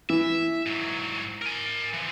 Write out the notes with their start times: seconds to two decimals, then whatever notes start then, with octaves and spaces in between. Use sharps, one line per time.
0.10 E3 E5
0.66 G#2 F#3
1.42 A#4 G#5
1.94 E3 F3